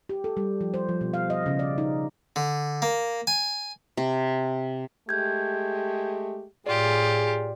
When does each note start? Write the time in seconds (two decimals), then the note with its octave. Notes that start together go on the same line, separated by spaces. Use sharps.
0.09 G4
0.24 A4
0.37 G3
0.61 F3
0.74 C5
0.89 F3
1.01 B2
1.14 F5
1.30 D#5
1.46 C#3
1.59 D5
1.78 D#4
2.36 D3
2.82 A#3
3.27 G#5
3.97 C3
5.09 G#3 A3 G4 G6 G#6
6.67 A2 F4 G4 G#4 D5